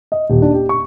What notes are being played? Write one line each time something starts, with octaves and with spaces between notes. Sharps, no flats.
D#5
D#1
D4
G4
C#6